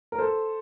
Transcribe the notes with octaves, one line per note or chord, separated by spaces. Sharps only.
A#4
A4 C5